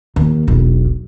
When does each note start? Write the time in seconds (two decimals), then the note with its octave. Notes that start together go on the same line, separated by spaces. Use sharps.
0.16 D#2
0.47 E1 B1